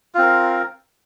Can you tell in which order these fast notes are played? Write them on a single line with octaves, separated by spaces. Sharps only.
F4 C4 A#4